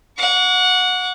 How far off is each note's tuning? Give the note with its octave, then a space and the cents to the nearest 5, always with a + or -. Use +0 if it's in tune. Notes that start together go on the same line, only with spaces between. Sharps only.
F#5 -20 C#6 +40